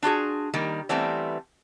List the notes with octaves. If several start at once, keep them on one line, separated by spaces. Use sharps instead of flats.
D4 F4 F#4 G#4
D#3 G3 A#3
E3 G3 A3 B3 C4